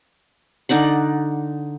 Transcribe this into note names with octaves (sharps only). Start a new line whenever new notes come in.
D3 D#4 D5 F#5